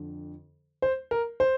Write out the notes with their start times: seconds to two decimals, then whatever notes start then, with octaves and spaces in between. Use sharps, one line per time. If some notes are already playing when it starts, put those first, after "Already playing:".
Already playing: F2 D3
0.82 C5
1.11 A#4
1.40 C5